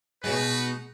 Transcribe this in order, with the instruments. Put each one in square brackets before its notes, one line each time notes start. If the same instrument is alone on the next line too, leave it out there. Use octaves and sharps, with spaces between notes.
[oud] B2 G#3 [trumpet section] D#4 F#4 B4